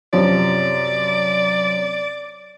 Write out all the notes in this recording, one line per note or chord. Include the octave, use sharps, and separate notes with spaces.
F#2 C3 F3 D5